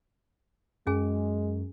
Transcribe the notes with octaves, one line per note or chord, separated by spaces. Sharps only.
F#2 G#3 C#4 G#4 G#5